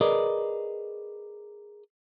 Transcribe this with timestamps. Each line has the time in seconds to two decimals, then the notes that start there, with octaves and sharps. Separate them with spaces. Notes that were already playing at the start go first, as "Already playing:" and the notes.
0.01 G#4 A#4 B4 D5 D#5